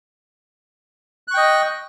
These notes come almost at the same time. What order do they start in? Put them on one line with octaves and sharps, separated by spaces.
F#6 C#6 G5 D#5